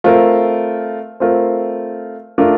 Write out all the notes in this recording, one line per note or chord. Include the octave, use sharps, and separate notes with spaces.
A3 C4 F4 A#4
A3 C4 F4 A#4
A3 D4 F4 A#4